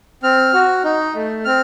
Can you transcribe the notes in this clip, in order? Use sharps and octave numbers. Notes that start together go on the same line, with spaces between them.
C4 F6
F#4
D#4
A3
C4 F6